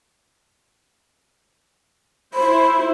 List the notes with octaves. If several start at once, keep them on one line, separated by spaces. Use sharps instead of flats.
E4 C5 B5